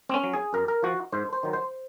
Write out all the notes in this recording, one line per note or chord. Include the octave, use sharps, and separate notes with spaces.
C4
C#4
F#3
G#4
F#2 A#4
A#4
F3 F#4
G#2 C5
C5
D#3 F#3
C5